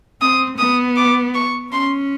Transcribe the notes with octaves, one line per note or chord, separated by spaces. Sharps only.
C4 D#6
B3 D#6
D6
C#6
C#4 C6